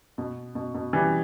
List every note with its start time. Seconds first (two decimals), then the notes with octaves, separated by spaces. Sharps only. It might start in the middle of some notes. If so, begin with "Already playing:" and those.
0.18 B2
0.55 B2
0.74 B2
0.93 E3 G3